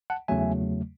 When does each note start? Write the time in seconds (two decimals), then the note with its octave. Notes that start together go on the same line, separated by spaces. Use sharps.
0.10 F#5 A5
0.28 E2 C#3 F#3 A3 E5 G#5